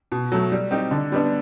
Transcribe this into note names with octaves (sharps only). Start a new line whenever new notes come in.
B2
F#3 A3
G3
C4 D#4 G4
D3
G3 B3 D4